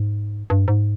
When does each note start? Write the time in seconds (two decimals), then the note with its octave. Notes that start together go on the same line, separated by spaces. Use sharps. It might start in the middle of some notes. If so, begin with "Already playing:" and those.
Already playing: G#2
0.50 G2
0.68 G#2